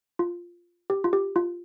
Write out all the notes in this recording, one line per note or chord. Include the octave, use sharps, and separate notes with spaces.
F4
G4
F4
G4
F4